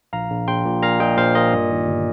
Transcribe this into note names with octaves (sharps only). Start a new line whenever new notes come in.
A#1 F5 A#5
A#1
A#1 G5 C6
A#2
A#2 F5 A#5
A#2 D#5 G5
A#1 C5 F5
A#2 A#4 D#5
G2
D#3
G1